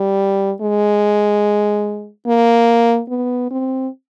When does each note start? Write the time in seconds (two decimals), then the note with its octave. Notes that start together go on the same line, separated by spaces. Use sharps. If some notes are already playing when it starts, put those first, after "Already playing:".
Already playing: G3
0.61 G#3
2.27 A#3
3.09 B3
3.51 C4